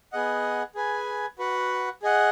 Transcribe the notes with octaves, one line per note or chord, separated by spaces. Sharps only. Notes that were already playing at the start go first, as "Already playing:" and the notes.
B3 G#4 D#5 F#5
G#4 B4 G#5
F#4 B4 F#5
G#4 D#5 F#5